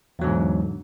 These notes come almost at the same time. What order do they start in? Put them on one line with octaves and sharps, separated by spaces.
E2 F#3 D3 G#2